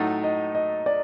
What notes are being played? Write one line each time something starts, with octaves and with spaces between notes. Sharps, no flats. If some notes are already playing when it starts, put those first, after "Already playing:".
Already playing: A2 F#3 A3 D#4 F#5
D#5
D#5
D5